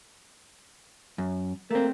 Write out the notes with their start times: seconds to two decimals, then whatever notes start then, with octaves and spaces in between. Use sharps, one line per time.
1.18 F#2
1.71 A3 A#3 C4